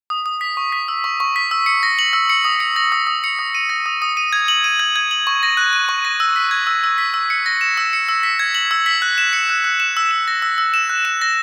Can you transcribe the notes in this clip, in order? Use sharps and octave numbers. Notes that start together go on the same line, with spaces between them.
D#6
D#6
B6
C#6
B6
E6
C#6
C#6
B6
E6
C#7
A#6
F#7
E6
C#7
D#6
C#7
A#6
D#6
D#6
C#7
D#6
D#7
A#6
D#6
D#6
D#7
G#6
F#7
D#7
G#6
G#6
F#7
C#6
A#6
F#6
D#7
C#6
A#6
E6
B6
G#6
E6
E6
B6
E6
C#7
A#6
E7
E6
C#7
E6
B6
G#6
F#7
E6
B6
F#6
E7
C#7
F#6
F#6
E7
E6
E7
A#6
E6
E6
E7
F#6
E7
A#6